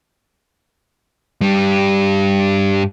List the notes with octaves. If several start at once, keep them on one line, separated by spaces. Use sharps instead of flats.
G2 G3